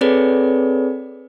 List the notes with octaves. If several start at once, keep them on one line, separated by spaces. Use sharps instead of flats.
C4 G#4 A4 B4 C#5 D5